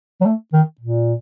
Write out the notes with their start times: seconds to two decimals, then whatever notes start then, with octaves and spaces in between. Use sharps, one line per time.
0.21 F#3
0.26 A3
0.53 D#3
0.81 A#2